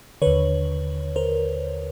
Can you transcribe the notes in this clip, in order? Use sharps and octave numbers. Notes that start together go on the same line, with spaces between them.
D#2 D3 B4 C#5
A#4 C5